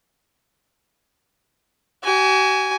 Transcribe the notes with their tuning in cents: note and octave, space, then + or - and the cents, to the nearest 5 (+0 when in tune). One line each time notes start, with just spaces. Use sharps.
F#4 +45 G#5 +0